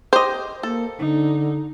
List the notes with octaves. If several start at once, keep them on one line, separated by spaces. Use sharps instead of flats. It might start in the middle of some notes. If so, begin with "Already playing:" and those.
G4 C5 D#5
A#3 A4
D3 D#4